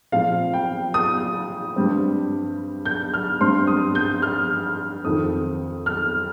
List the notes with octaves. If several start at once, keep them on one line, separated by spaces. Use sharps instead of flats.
A#2 F3 C4 F5
G5
D#6
G2 G3 C4
G6
F6
G2 G3 C4 C6
D#6
G6
F6
F2 D#3 C4 D#6
F6